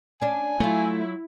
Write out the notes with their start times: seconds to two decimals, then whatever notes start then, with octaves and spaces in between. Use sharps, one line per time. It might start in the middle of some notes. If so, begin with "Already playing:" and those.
0.21 C#4 D4 G#5
0.60 F#3 A3 E4 F4